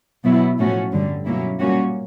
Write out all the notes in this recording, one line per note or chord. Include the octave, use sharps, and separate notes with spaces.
B2 F#3 B3 E4
A2 F3 A3 C#4 F#4
G2 D3 G3
B2 F#3 A#3 C#4 E4
A#2 G3 A#3 C#4 F#4